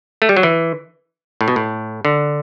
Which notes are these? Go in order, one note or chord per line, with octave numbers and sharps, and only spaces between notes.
A3
G3
F#3
E3
A2
B2
A2
D3